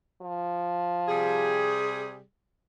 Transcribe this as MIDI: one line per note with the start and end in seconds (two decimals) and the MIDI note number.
0.22 1.78 53
1.09 2.21 48
1.09 2.21 55
1.09 2.21 68